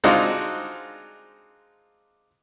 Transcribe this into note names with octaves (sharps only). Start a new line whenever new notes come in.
G#3 C4 D4 D#4 F4 F#4